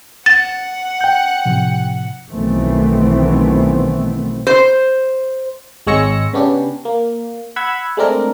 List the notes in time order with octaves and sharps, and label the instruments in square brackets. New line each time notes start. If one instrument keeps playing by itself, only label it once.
[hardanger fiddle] F#5 [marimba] A6
[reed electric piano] G5 G6
[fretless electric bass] A2 C3 F3
[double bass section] B1 D#3 E3 A3 B3 C4
[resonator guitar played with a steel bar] C5
[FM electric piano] G#1 G#3 C#5 E6 A#6 C#7
C#3 B3 C#4 D4 G4
A#3
F#5 B5 E6 G#6
G#3 A3 C4 D4 A#4